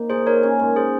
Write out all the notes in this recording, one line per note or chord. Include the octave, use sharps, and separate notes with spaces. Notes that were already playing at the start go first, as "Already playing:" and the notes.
Already playing: A#3 C4 D#4
A#2 G#4 C5
D#4 A#4 C#5
C#4
G#2
G#4 C5